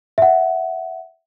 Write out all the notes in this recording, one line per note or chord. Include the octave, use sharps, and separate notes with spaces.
E5 F#5